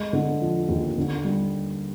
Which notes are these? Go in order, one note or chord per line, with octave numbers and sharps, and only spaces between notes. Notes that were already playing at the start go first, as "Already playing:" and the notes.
Already playing: G#3
D3
F3
D#2
D3
G3